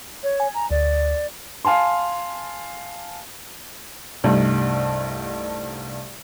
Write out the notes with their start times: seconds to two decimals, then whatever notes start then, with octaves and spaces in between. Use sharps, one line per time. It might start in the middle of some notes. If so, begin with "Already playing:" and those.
0.24 C#5
0.40 G#5
0.54 A#5
0.71 D2 D5
1.65 F5 G#5 A5 C6
4.24 C2 G2 A3 D#4